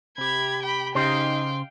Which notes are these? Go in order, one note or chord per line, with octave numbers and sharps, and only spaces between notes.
C3 G4 B5 G#6
G5 B5
C#3 D#4 G4 C5 D#5 F5 G5